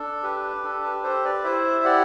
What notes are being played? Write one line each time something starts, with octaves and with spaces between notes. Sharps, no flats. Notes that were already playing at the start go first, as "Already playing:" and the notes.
Already playing: D4 A4
G4 B4
D4 A4
B4
G4 A4 C5
B4 D5
E4 C5 E5
G4 D5 F#5